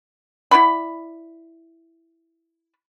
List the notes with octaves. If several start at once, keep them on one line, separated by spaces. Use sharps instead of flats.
E4 D5 F#5 B5